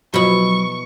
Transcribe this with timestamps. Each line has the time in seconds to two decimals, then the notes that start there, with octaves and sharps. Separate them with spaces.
0.14 B2 F3 F#3 E4 C#6